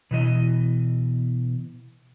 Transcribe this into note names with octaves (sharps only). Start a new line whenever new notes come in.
B2 E3 D#5